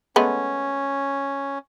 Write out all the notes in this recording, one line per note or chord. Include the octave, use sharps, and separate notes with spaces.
G#3 A3 B3 C#4